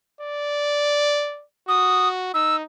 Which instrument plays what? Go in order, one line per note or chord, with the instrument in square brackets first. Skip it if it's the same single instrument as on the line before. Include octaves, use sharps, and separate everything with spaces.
[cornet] D5
[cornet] F#4 [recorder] D#6
[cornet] D#4 [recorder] E6